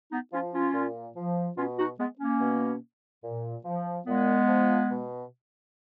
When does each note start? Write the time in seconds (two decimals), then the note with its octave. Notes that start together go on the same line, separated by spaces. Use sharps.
0.12 B3 D#4
0.32 F3 C#4 F4
0.54 C#4 F4
0.74 A#2
1.16 F3
1.57 B2 C#4 F4
1.78 D#4 F#4
1.98 G#3 B3
2.19 A#3 C#4
2.40 B2
3.24 A#2
3.65 F3
4.06 A#2 G#3 B3
4.48 F3
4.90 B2